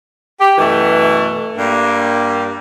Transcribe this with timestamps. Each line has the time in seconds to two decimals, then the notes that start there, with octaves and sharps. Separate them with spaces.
0.39 G4
0.58 F#2 B2 E3 A3
1.57 G2 G3 A#3